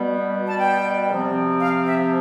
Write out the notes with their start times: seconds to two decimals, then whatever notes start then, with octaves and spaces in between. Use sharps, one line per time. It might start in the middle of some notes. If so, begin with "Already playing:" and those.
Already playing: B2 G3 B3
0.48 A5
0.59 G5
1.10 C3 F3 C4
1.61 F5
1.87 E5